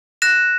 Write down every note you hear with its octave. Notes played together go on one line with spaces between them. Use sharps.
F#6 A#6 E7